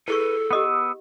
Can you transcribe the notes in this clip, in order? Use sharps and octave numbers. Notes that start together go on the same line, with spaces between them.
E4 G#4 A4 B4 C#6
B3 G4 D#5 F#5 D#6 E6